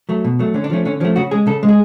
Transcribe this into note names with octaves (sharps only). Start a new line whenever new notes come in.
F#3 A3
B2
F#3 A3
D3 C#4
D4
F3 A3 C#4
D3 C#4
F3 A3 C#4
C#3 F#4
G#3 G#4
C#3 A4
G#3
G#4